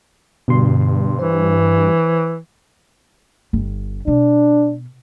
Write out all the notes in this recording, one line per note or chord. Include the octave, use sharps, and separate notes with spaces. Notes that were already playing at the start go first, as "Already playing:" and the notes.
G2 B2 D3 C6
E3 C5
G1
B2 D4